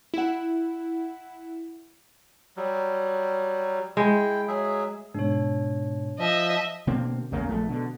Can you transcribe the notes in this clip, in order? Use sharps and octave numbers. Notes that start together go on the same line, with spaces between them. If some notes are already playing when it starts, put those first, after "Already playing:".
E4 F#5
F#3 G3
G#3 E4 G5
F#3 G#4 E5
G#2 B2 D4 C#5
F3 D#5 E5
B2 D3 A#3 C4
A#1 E2 C#3 A#3
A#1 A3
B2 D3